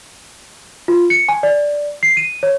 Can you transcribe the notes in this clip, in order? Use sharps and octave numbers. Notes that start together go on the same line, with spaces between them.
F4
C#7
G#5
D5
C7
D#7
C#5